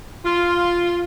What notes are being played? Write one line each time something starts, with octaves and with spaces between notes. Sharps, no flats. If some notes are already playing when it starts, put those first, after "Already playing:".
F4